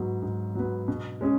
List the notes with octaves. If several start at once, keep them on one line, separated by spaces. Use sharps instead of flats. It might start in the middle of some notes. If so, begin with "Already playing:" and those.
Already playing: G#2 F#3 B3
G#2
F#3 B3
B2
G#3 C#4 G#4